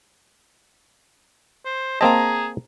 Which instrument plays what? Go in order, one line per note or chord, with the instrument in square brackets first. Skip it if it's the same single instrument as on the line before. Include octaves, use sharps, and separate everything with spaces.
[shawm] C5
[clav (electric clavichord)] A#3 C4 D#5 [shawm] G#4 [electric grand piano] A5 A#5